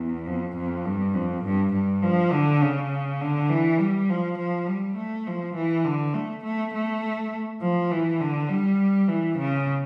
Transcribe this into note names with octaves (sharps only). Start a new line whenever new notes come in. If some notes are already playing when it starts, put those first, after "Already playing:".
Already playing: E2
F2
F2
G2
F2
G2
G2
F3
D3
C#3
D3
E3
G3
F3
F3
G3
A3
F3
E3
D3
A3
A3
A3
F3
E3
D3
G3
E3
C#3